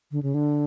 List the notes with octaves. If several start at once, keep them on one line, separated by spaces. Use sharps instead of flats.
D3
C#3
D3